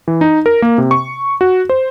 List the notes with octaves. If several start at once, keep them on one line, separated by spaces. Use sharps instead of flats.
E3
D#4
A#4
A#3
C3
C#6
F#4
C5